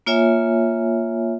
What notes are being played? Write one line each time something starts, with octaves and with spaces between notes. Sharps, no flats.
A#3 F4 C#5 E5 G#5